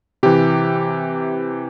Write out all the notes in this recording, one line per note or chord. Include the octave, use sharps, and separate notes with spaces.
C3 E3 G4